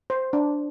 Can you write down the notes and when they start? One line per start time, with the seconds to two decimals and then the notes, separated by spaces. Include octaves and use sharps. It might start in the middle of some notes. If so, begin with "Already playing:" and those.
0.10 C5
0.33 D4